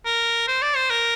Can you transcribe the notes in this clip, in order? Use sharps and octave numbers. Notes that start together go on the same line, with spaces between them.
A#4
C5
D5
C5
A#4